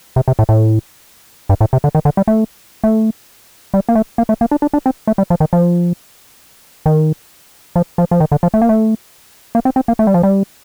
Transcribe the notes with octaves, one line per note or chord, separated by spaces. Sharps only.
C3
C3
A2
A2
G2
A2
C3
D3
D#3
D3
G3
A3
A3
G3
A#3
A3
A#3
A3
A#3
D4
D4
D4
C4
A3
G3
F3
D#3
F3
D#3
F3
F3
F3
D#3
D3
F3
A3
A#3
A3
A#3
C4
C4
A#3
A3
G3
F3
G3